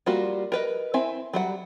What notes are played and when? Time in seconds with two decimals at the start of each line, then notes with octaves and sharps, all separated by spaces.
0.06 G3 A#3 F4 F#4
0.52 A#4 B4 D#5
0.94 C4 E4 E5 G#5
1.33 F#3 G3 F#5